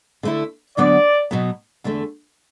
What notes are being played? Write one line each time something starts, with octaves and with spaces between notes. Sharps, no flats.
D3 A3 E4
D2 D3 F#3 B3 D5
B2 F#3 B3
E2 D3 A3